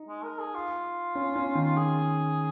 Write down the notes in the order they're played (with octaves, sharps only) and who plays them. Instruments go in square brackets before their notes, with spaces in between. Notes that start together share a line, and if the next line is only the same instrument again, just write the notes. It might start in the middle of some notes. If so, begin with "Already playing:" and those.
Already playing: [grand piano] D#4
[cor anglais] G#3
A#4
G#4
F4
[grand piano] C#4
C#4
D#3
[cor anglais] G#4